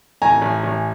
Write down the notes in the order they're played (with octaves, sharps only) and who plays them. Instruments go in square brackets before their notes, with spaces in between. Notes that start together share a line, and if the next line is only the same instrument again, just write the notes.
[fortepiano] A1 G#5 A#5
A1
A1